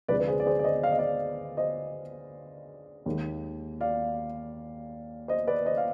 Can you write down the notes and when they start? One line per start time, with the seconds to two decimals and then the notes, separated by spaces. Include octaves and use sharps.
0.08 D2 C3 F3 G#3 B4 D5
0.20 B4
0.27 G#4 C5
0.40 D5
0.46 G#4 C5
0.59 D5
0.64 C5 D#5
0.83 F5
0.92 D#5
0.98 D5 F5
1.57 C5 D#5
3.06 D#2 D#3 G#3
3.81 D5 F5
5.28 C5 D#5
5.47 B4 D5
5.66 C5 D#5
5.77 F5